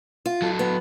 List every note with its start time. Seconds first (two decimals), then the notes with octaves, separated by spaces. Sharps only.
0.26 F4
0.42 F#3 A4
0.59 B3